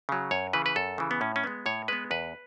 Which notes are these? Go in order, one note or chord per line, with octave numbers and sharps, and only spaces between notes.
C#3 F#3
F#2 C#5
C#3 E3 B4
B4
F#2 A4
C#3 E3
B3
A2 C#4
C#4
G#3 B3
A2 C#5
G#3 B3 B4
E2 B4